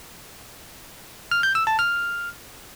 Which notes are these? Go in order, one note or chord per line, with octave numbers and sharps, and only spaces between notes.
F6
G6
E6
A5
F6